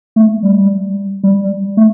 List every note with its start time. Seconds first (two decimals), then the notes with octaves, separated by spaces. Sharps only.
0.16 A3
0.43 G3
1.23 G3
1.77 A3